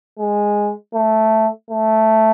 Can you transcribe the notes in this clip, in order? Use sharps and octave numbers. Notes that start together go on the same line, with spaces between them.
G#3
A3
A3